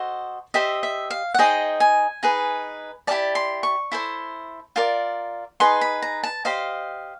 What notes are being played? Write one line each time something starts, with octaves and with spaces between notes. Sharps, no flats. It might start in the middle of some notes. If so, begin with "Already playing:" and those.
Already playing: F#4 A4 C5 D#5
G4 C5 D#5 E5
E5
F5
F#5
D#4 G#4 C5 D#5 G5
G#5
D#4 G#4 B4
E4 G4 A#4 D5 A5
C6
C#6
E4 A4 C5
F4 A#4 D5
D#4 G#4 B4 C6
B5
A#5
A5
G4 C5 D#5 F5